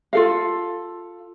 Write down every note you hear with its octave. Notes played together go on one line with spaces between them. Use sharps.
F4 A4 F5